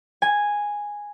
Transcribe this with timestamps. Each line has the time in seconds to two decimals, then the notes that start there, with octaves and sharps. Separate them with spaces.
0.22 G#5